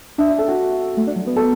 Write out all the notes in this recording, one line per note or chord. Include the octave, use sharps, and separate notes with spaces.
D4 E5
E5
A4
F#4
A3
D4
F#3
B3
A4